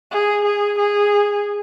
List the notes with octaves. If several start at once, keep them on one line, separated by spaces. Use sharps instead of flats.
G#4
G#4
G#4